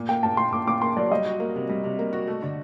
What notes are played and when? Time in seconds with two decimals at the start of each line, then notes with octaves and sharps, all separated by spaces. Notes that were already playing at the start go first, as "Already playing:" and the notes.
Already playing: A#2
0.09 A#3 G5
0.23 A#2 A5
0.37 A#2 C6
0.52 A#2 D6
0.67 A#2 D6
0.82 A#3 C6
0.96 F#3 D5
1.12 G3 D#5
1.26 F#4
1.40 A#3
1.55 C3
1.69 G3
1.84 C3
1.99 A#3
2.13 F#4
2.27 A3
2.42 D3